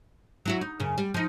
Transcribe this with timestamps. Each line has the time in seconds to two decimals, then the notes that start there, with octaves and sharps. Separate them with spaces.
0.46 F#3 E4 F#4
0.61 D#4
0.80 F#2 C#3
0.98 G3
1.14 F3 D#4